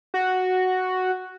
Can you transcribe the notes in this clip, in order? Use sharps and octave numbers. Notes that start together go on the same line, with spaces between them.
F#4